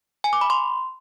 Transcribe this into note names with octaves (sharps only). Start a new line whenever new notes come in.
G#5
D6
B5
C6